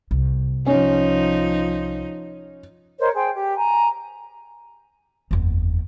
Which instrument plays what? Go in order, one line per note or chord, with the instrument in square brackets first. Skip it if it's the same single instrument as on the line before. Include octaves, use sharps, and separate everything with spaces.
[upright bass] C2
[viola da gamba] F3 D#4 [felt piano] C#4
[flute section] A#4 C5 C#5 D#5
G#4 C5 G5
G4
G#5 A#5
[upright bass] F#1 E2